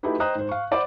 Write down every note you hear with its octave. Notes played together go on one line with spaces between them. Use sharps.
A3 D#4 E4 F#4 G4 B4
C5 D#5 G5 A#5 D#6 F#6
G#2 C5
F5 C#6
C5 D5 F#5 B5 D6